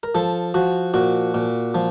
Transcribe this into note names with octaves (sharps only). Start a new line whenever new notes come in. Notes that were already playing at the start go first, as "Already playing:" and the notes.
A#4
F3 A4
F3 F#4
A#2 F#4
A#2
F3